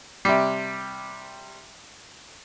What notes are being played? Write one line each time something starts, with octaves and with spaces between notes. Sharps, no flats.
C3 G3